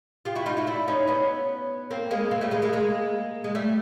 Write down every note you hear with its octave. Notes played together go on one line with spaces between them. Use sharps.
F4 G4
E4 F#4
D#4 F4
E4 F#4
D4 E4
C#4 D#4
B3 C#4
A#3 C4
G#3 A#3
A#3 C4
G3 A3
G#3 A#3
G#3 A#3
G#3 A#3
G#3
G3 A3